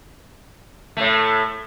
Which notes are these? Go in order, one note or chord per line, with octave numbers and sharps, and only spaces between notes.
A2 A3